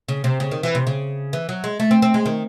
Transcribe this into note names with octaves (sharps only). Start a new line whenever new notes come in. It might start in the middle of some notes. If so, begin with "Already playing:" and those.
C#3
C3
C#3
D#3
E3
C3
C#3
E3
F#3
G#3
A3
C4
C4
G#3
D#3